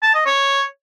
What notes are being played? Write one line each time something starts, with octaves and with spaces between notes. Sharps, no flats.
A5
D#5
C#5